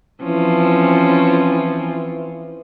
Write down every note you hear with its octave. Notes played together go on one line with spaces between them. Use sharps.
E3 F3 C4 C#4